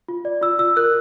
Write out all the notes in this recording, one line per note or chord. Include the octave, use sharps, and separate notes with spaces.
F4
D5
F4 E6
F4 E6
A#4 F#6